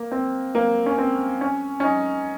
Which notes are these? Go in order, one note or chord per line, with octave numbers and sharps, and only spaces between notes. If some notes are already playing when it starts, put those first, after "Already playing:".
Already playing: A#3
C4
A#3
C#4
C4
C#4
C#4
D#4